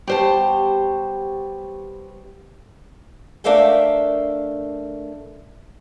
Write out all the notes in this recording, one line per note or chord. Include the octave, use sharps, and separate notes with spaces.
G3 B3 G4 C5 C#5 A5
A3 D4 A#4 E5 F5 G5